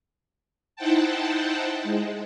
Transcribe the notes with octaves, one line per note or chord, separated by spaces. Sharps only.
D#4 E4 C5 F#5 G5 A5
G#3